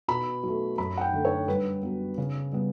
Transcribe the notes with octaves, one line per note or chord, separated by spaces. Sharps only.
B2 B5
F#3 A3
F#2 B5
F#5
G5
D3 A3
C#5
G2 B4
F#3 B3
C#3
G3 B3